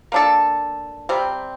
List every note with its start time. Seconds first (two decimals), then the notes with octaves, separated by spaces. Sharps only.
0.12 A#3 D4 A4
1.09 C3 G3 C4